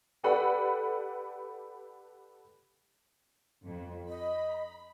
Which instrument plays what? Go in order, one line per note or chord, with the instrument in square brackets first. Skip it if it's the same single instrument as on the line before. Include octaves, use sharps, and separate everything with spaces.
[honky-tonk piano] G4 A4 B4 D5 F#5 B5
[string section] F2
[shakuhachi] D#5 [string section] B5